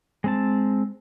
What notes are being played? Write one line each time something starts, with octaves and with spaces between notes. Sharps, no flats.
G#3 C4 A5